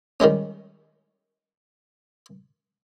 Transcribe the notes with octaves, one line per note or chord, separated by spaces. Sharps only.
D#3 G3 G#3 C#4